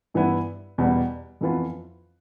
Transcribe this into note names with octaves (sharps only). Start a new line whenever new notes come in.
G2 E3 B3 E4
E2 B2 G3 B3
F2 E3 B3 F4